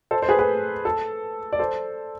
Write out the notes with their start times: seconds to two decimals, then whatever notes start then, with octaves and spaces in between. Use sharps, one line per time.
0.11 A4 C5
0.22 C5
0.29 G#4 B4
0.39 G#4 B4
0.85 A4
1.53 D5
1.59 A4 C5